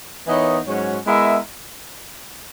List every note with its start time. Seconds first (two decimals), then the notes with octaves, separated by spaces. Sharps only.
0.27 E3 B3 D#4 A#4 C#5
0.67 G#2 F#3 C#4 F#4 C#5
1.06 G#3 B3 E4 A#4 E5